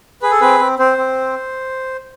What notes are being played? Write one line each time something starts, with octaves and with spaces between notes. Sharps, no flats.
G#4 B4
A4
C4 B4
C4
C4 C5
C4